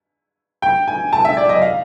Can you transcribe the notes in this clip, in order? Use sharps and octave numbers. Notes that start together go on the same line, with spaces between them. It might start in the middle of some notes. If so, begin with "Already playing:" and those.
G5
G#5
A5
E5
D5
D#5
F5